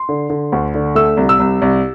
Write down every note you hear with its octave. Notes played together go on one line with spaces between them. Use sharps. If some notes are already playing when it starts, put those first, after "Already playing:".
Already playing: C6
D3
D3
D2
D3
A3 E6
C2
E6
C2
C2